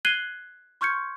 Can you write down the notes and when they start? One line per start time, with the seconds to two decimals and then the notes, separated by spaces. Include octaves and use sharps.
0.05 F#6 G#6 C7 D#7 F#7 G7
0.81 C6 C#6 F6 G6 G#6 C#7